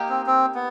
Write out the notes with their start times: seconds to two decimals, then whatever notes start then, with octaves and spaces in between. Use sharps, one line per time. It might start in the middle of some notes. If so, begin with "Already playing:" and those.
Already playing: A#3 D#4 G4
0.09 C4
0.27 C4
0.55 B3